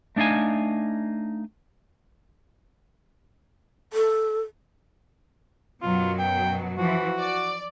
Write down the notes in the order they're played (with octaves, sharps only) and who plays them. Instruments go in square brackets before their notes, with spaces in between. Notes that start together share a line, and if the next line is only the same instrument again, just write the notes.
[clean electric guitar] A3 D4 D#4 F5 G#5
[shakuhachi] A4
[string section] F#2 B2 F#3 [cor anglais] F4
[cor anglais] G5
[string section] E3 F3 [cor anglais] F#4
[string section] D5